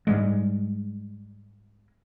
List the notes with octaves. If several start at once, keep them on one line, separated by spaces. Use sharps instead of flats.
G#2 G3 G#3